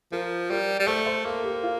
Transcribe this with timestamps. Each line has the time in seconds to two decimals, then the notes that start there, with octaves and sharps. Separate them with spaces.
0.12 F3 A#4
0.50 G3 A#4
0.80 G3
0.87 A3 C5
1.06 C5
1.25 A#3 A4
1.44 G4
1.63 F4